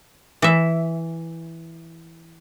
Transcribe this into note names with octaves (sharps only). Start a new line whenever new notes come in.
E3 E5